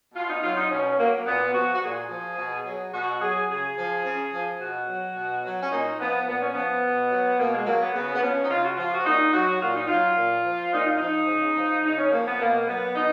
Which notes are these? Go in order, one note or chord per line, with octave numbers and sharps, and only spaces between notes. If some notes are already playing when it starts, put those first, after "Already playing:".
B2 F4
D#4
F#3 F4
D#4
B2 C#4
F#3 A#3
A#3
A#2 B3
F3 F#4
F#4
A#2 G#4
F3
B2
F#3
B2 F#4
F#3 G#4
C#3 G#4
F3
C#3
F3
B2 F#4
F#3
B2
F#3
C#4
A#2 D#4
F3 B3
A#2 B3
C#4
F3 B3
B2
F#3
B2 A#3
G#3
F#3 A#3
B3
C#3 B3
B3
F3 C#4
D#4
C#3 F4
F#4
F3 F4
F#4
F4
A#2 D#4
F#3 F#4
A#2 F4
D#4
F#3 F4
A#2
F3
A#2 D#4
F4
F3 D#4
C#3
F3
C#3 D#4
C#4
F3 A#3
B3
B2 A#3
F#3 B3
B2 D#4